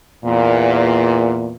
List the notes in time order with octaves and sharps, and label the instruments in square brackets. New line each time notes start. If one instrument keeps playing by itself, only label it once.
[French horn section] E2 A#2